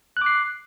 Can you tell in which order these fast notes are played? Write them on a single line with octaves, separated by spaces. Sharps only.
F#6 D6 C7